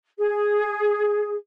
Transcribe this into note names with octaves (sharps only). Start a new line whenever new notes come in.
G#4